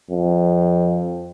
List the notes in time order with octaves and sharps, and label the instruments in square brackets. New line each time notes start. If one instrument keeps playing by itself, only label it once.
[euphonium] F2